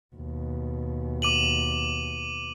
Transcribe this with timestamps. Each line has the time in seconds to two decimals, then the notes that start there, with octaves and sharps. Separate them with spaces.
0.16 D#2 B2
1.22 D6 D#7 F#7